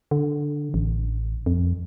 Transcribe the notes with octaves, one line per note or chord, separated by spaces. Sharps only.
D3
A1
F2